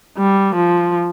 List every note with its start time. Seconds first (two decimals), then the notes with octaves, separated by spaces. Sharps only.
0.18 G3
0.56 F3